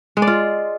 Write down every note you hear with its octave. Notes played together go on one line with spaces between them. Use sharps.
G#3
D5
F4